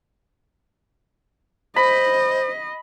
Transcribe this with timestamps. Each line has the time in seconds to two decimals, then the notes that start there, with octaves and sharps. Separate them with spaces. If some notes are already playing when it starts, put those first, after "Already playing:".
1.76 C5 D#5 B5